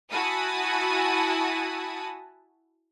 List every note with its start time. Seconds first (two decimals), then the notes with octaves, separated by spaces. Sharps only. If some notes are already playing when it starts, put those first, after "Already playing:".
0.10 E4 F#4 G#5 A5 B5 D#6